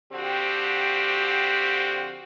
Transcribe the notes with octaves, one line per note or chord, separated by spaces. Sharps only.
D3 F3 C4 F#4 G4